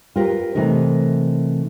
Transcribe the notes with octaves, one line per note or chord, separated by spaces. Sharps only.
F4 G4 A#4 B4
C3 E3 A3 D#4 A#4